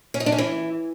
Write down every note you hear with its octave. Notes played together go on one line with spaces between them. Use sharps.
C#4
D#4
D4
C#4
E3